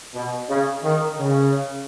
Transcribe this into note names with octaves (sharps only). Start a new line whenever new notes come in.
B2
C#3
D#3
C#3